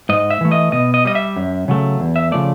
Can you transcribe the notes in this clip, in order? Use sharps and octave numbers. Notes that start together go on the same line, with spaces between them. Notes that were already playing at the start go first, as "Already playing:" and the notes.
G#2 D#5
E5
E3 A3
D#5
B2 D#5
D#5
G3 D#5
E5
F#2
C#3 F#3 A3
E2
E5
C#3 F3 A3 D5